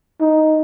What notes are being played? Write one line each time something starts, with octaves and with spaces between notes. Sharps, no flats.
D#4